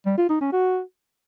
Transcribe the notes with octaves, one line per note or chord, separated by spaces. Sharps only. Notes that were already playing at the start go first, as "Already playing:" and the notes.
G3
F4
D#4
C#4
F#4